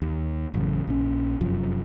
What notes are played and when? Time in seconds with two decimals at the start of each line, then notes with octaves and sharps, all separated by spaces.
0.02 D#2
0.54 A1 F#2 C#3
0.87 A#1 C#4
1.41 F1 F#2 F3